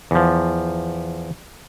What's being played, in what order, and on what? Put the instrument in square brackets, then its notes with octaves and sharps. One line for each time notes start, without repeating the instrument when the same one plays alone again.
[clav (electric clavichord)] E2 F3